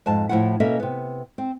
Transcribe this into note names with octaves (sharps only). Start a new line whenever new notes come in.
F2 G#2 A5
A2 F3 E4 F4 F#5
B2 A#3 C#4 A4 D#5 E5
C3 B3
C4